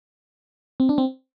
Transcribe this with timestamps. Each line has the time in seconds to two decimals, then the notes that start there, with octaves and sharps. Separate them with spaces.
0.80 C4
0.89 D4
0.98 C4